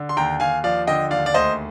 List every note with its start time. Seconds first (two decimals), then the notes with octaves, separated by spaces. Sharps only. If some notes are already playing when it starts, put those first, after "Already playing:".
Already playing: D3
0.09 C6
0.17 D#2 G5 A#5
0.40 D#2 F5 G#5
0.64 F3 D5 F5
0.87 D3 D#5 G5
1.10 D#2 D5 F5
1.26 D5
1.34 D2 C5 D#5